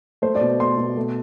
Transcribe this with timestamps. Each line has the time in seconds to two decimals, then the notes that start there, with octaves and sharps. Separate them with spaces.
0.22 A3 C5
0.35 D5
0.41 B2
0.59 A3 C6
0.77 B2
0.97 A3